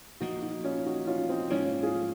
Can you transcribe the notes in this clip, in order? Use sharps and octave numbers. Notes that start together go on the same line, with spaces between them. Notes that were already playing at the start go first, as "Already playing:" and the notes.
A#2 F3 A#3 D#4 F#4
D#4 F#4
C#4 F4
D#4 F#4
C#4 F4
C4 D#4
G#2 F3 A#3 C#4 F4
F4 G#4